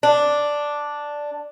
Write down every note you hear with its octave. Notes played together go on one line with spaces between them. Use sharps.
D4